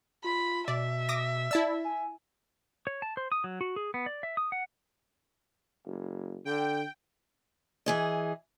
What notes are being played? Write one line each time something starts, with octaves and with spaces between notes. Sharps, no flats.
F4 B5
B2 D5 E5
D6 D#6 A#6
E4 D5 A5 E6
G#5
C#5
A5
C5
D#6
F#3
F#4
G#4
B3
D5
E5
D#6
F#5
F#1
D3 G5
E3 G#4 D#5